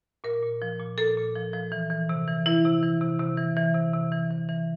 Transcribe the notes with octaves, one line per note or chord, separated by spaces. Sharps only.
A#2 A#4
A#2
F3
A#2
A#2 A4
A#2
F3
F3
E3
E3
C3
E3
E3 E4
C3
E3
C3
C3
E3
E3
C3
C3
E3
E3
E3